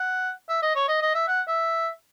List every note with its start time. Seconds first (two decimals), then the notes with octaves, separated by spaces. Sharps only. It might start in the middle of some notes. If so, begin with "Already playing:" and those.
Already playing: F#5
0.49 E5
0.62 D#5
0.75 C#5
0.88 D#5
1.02 D#5
1.15 E5
1.28 F#5
1.48 E5